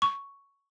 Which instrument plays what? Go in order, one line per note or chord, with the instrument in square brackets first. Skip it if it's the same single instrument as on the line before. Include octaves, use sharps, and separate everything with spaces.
[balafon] C#6